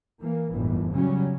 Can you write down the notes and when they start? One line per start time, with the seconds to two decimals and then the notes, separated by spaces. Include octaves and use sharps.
0.21 E3 A#3
0.53 G1 F2 A2 E3
0.92 C#3 F#3 G3 C#4